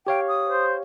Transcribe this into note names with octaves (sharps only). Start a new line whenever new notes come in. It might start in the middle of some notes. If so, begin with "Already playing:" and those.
G4 C#5 F5 G5
D#6
C5